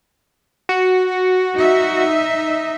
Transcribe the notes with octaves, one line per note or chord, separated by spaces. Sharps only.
F#4
D#4 D#5 E5